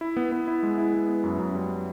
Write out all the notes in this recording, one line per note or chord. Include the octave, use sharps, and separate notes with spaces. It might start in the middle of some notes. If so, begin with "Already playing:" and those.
E4
B3
B3
E4
G#3
E4
B3
B3
F#2
F#2
G3